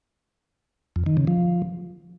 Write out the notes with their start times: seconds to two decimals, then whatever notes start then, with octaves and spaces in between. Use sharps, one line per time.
0.96 F2
1.06 D#3
1.17 C#3
1.27 F3